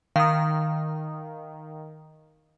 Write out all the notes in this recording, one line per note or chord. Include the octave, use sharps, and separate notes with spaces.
D#3 F5 D#6